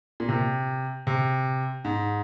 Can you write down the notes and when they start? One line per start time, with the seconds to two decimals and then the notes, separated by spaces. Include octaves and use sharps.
0.20 A#2
0.29 C3
1.07 C3
1.85 G#2